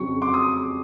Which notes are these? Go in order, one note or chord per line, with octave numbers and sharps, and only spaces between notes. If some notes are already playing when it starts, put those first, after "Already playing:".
Already playing: F2 C#3 F#3 C#6
C6 D6
D#6